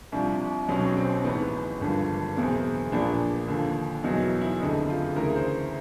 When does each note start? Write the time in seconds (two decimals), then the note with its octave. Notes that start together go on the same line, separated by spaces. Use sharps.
0.12 C2 C3 F3 D4
0.68 B1 B2 F#3 C#4
0.97 C4
1.24 A1 G#2 E3 B3
1.81 G#1 G2 D3 F3
2.37 F#1 E2 B2 C4
2.92 A#1 A#2 F3 D4
3.48 D#2 D3 F3
4.04 E2 B2 F#3 D#4
4.23 E4
4.41 E4
4.60 F#1 F2 D3 D#4
4.88 F4
5.16 D2 C#3 E3 A#4
5.35 C5